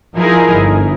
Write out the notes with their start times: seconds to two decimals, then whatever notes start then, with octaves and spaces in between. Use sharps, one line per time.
0.16 F3 D#4 E4 G#4 A#4
0.53 G1